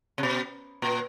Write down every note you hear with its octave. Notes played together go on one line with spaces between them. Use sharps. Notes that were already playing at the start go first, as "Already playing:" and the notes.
C3
B2
A#2